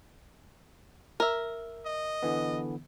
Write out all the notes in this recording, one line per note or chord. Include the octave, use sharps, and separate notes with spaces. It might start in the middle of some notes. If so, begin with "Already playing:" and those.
A#4 E5
D#5
D3 E3 B3